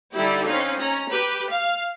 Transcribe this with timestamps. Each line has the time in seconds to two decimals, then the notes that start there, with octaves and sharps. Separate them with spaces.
0.14 D3 G3 D#4 E4 G4
0.46 C4 C#4 D#4 F5
0.79 C#4 A#5
1.09 G4 B4
1.48 F5